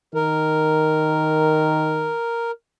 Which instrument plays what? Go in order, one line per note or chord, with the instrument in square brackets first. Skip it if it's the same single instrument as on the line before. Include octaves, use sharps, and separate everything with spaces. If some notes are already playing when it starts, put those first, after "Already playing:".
[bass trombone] D#3 [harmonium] A#4